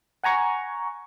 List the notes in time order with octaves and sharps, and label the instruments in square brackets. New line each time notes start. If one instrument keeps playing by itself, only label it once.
[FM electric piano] F#5 G#5 A#5 C#6